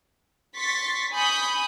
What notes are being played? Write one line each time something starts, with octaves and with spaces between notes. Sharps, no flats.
C6 C#6 A6 B6
G#5 B5 C#6 D#6 G6